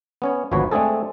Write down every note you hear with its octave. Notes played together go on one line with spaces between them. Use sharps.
B3 C#4 C#5
G#1 D2 F3 F#4 B4 C#5
G#3 A3 C4 D4 G#4 A4